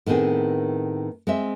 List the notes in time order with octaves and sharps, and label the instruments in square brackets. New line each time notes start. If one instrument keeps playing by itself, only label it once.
[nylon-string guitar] A2 D#3 B3 C4 G#4
G#3 C4 E5